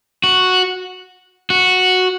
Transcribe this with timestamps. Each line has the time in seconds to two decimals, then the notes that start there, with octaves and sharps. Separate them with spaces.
0.24 F#4
1.50 F#4